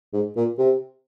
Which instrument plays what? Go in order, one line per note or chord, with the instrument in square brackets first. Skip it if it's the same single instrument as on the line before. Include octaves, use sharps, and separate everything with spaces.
[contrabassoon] G#2
A#2
C3